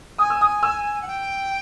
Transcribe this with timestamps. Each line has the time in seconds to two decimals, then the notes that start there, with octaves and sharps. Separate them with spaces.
0.18 G#5 D#6
0.30 E6
0.41 D#6
0.63 E6
1.02 F#5
1.08 G5